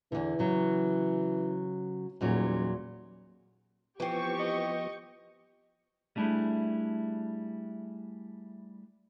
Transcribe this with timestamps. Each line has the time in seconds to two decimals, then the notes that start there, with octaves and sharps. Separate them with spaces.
0.12 E2 D3 E3
0.39 C#3 F#3
2.21 D#1 E2 A#2 F#3
4.00 E3 F3 B3 C4 G4 G5 C#6
4.40 D#5
6.16 G3 A3 D4 E4 G#4